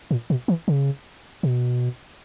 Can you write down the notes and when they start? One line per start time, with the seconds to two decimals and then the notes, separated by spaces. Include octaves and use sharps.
0.11 A#2
0.30 B2
0.48 E3
0.68 C#3
1.43 B2